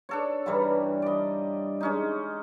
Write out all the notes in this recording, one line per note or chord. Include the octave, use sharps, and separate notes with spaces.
D4 A4 C#5
G2 E3 G3 A#5
D5 D#5
G#3 C#4 D#4